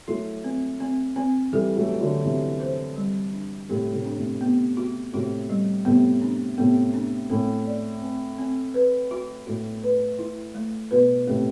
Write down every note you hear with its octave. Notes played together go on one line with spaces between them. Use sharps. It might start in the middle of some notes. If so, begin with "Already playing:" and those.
F#3 A3 E4
C4
C4
C4
E3 G3 A4
F#3 A3
F#4
D3 F#3
C3 E3 D4
C5
G3
D4
A2 C3 G4
A2 C3
D4
A2 C3
B3
F#4
A2 C3 F#4
G3
A2 C3 B3
D4
A2 C3 B3
D4
A2 C4
D5
C4
C4
B4
F#4
A2 F#4
B4
E4
A3
B2 B4
A2 C3 A3